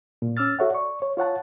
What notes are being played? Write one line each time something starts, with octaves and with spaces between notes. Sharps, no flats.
A#2
C#4 D6 E6 F6 A6
F#4 A4 C#5 E5 F#5
D5 C#6
C#5
F4 C#5 F#5 A5